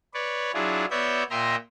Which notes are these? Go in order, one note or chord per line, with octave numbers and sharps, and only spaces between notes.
B4 C#5 D5
F#3 D4 E4 F4 G#4
B3 F#4 C#5 D5 E5 G6
A#2 D#5 E5 G5 A#5 C6